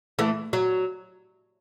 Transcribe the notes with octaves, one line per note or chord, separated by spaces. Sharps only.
E3 A3
F#3